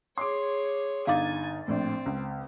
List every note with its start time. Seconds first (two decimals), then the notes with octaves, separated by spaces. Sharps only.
0.18 G#4 C#5 C6 D6
1.07 G1 D#4 F5 G5 G#5 D6 A6
1.68 A#1 A2 C4
2.06 C#2